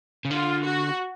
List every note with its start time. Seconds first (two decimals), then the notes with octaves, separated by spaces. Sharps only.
0.25 C#3
0.31 D3 F4
0.64 F#4